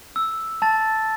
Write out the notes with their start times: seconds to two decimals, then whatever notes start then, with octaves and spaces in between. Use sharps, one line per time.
0.16 E6
0.62 A5 A6